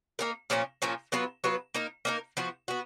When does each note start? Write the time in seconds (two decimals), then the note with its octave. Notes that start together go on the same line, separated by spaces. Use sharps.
0.19 A#3 D#4 A#4
0.50 A#2 F3 A#3 C#4
0.82 A#2 F3 A#3 C#4
1.12 F#3 B3 F4 B4
1.44 F#3 B3 F4 B4
1.74 A#3 D#4 A#4
2.05 A#3 D#4 A#4
2.37 F3 B3 F#4
2.68 B3 F#4